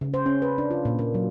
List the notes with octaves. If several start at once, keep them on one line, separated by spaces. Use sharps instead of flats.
C#3
C5
C#4
B4
D4
F4
A#2
A#3
F#3